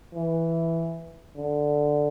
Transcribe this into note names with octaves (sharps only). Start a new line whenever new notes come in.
E3
D3